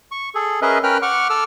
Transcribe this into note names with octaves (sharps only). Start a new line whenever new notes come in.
C#6
G#4 A4
C#4 G#4 A#4 B4 D#5 E5
C#4 A#4 B4 G5 F6 F#6
F#5 C#6 D6 F6
A4 D6 E6 F6